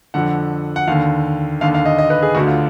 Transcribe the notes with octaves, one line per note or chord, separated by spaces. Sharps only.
F2 D3 F#5
F#5
D#2 D3 F5
D#2 D3 F5
F5
D#5
D#5
B4
G#4
D2 D3 F#4
F4